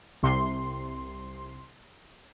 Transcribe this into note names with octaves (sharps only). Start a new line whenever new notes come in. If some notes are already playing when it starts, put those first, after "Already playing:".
C2 C3 C6